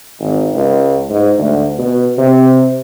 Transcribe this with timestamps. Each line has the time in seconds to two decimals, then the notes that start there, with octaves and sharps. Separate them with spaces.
0.20 G#1
0.54 C#2
1.10 G#2
1.38 D2
1.79 B2
2.18 C3